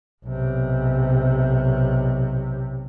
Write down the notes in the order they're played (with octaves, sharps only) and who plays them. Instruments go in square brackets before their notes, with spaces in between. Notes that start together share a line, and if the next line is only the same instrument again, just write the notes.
[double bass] B1 C3